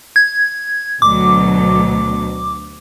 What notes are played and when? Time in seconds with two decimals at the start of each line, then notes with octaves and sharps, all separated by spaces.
0.16 G#6
1.02 D2 B2 F#3 D6